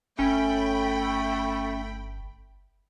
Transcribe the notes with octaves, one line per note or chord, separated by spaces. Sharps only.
G1 A3 C#4 G5 B5